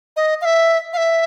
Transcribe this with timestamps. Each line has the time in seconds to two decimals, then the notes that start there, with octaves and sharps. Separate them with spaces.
0.16 D#5
0.41 F5
0.45 E5
0.93 F5
0.97 E5